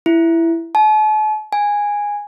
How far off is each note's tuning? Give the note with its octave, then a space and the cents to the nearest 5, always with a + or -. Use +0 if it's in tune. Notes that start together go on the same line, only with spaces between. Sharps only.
E4 +10
A5 -45
G#5 -10